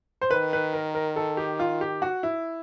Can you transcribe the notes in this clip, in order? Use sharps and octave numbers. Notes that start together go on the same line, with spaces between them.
C5
D#3 B4
B4
A#4
A#4
A4
G4
F4
G4
F#4
E4